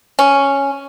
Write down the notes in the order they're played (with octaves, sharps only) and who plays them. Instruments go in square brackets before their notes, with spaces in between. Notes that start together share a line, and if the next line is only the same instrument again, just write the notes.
[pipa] C#4